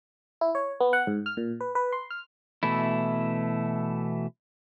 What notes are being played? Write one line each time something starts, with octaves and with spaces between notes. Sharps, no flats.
E4
C#5
B3
F#5
G#2
F6
A#2
B4
B4
C6
F6
B2 E3 A3 E4